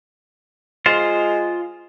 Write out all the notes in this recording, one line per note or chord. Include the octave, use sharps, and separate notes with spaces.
G#3 F4 C5